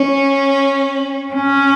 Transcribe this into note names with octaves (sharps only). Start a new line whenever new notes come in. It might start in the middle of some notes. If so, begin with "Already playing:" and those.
Already playing: C#4
C#4